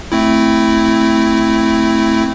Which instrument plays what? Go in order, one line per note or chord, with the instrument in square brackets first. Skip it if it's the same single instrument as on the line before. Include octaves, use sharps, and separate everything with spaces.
[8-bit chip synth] A3 C4 E4